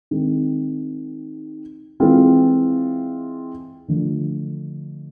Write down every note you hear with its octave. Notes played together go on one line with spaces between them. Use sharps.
D#3 G#3 C4
E3 G#3 C4 F4
D3 F3 A3